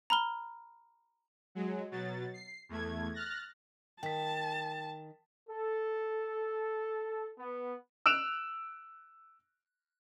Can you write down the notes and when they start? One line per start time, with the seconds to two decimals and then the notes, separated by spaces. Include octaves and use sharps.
0.10 A#5 B5 F6 G7
1.55 F#3 G#3
1.91 B2 F#3 A6
2.34 C7
2.69 E2 A3 G#6
3.14 F6 F#6 A6 A#6
4.03 D#3 G5 A5 B6
5.49 A4
7.38 B3
8.06 E6 F#6 D7 E7 F7